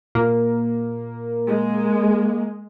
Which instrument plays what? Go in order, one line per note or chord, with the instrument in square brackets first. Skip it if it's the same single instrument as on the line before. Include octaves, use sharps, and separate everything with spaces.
[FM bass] A#2 [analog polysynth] A#3
[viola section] G#3